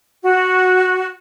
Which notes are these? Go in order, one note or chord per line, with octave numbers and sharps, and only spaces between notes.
F#4